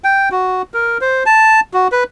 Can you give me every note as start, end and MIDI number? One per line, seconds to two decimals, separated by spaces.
0.04 0.29 79
0.31 0.62 66
0.74 0.98 70
1.01 1.23 72
1.26 1.60 81
1.74 1.88 66
1.92 2.04 71